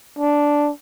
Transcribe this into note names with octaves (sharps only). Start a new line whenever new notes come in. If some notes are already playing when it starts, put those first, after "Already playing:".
D4